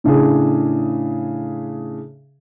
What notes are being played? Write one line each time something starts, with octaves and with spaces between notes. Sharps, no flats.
A2 C#3 D4 G#4